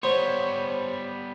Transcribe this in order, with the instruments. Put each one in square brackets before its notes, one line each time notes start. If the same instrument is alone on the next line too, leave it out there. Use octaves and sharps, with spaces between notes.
[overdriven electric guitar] G3 B3 [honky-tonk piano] C5 [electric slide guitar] C#5